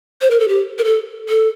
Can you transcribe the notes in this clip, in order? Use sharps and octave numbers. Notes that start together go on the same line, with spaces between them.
C5
A#4
A4
G4
A#4
A4
A4